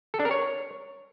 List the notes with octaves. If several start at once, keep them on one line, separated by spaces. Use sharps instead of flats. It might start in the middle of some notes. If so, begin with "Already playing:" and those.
A4
D4
A#4
C#5